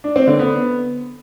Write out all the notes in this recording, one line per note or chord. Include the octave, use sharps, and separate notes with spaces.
D4
C4
D3
B3